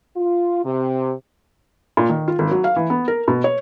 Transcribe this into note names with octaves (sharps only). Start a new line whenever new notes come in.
F4
C3
A#2
D#3
F4
G#1
F#3
F5
E3
B3
A#4
B2
C#5